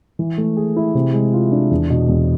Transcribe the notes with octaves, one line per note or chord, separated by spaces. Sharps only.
E3
A3
G#4
E4
C3
G#3
F4
D4
E2
B2
E2